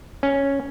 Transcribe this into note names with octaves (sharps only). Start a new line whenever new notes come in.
C#4